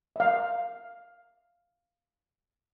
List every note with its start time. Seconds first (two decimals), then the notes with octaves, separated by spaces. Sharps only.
0.16 E5 F5